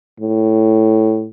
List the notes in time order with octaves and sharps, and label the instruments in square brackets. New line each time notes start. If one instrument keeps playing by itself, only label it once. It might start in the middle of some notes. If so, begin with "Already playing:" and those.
[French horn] A2